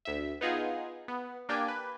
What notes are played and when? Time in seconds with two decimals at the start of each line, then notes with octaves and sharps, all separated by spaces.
0.05 D2 E5
0.41 B3 D#4 F4 G#4
1.08 B3
1.49 A#3 D4 G4 D5 G5 G#5
1.68 B4